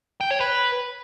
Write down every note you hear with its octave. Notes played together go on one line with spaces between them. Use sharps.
G5
C#5
B4